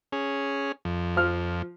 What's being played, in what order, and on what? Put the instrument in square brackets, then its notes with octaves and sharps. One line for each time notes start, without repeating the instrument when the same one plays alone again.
[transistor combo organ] C#4 G#4
F2
[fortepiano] F3 F6